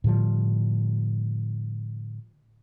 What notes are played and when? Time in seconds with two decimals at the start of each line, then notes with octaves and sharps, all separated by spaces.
0.04 A2 D3 F3 G3